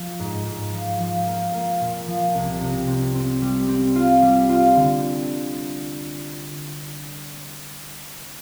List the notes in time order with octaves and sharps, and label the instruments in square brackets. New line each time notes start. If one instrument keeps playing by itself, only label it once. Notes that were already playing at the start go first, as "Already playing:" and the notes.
Already playing: [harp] F3
G#2
G#2
F3
F3
A#3
A#3
A#2
F3
C2
C3
C4
C4
G3
C4
F4
G3
F4
D3